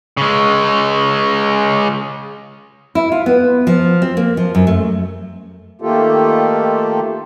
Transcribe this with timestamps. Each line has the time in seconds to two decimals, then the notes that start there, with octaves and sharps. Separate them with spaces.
0.17 C#3 G#3
2.95 E4
3.12 F4
3.26 B3
3.67 F3
4.02 C4
4.17 A#3
4.37 F3
4.55 F#2
4.67 A3
5.81 D#3 A3 A#3 F4 G4 A4